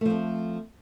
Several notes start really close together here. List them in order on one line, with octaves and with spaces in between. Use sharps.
A3 F3 C4